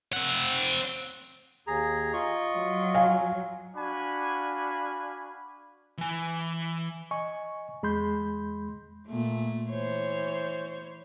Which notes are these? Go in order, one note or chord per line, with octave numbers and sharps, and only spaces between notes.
C4 F#5
D#2 G#4 A#5
F4 D#5 C#6
F#3
F5 G#5
D4 F#4 F5 G#5 B5
E3 G#5
D#5 G#5 C#6
E2 G#3 B5 C6 G6
A#2 A3
E3 C5 C#5